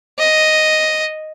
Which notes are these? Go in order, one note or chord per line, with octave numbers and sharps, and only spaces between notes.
D#5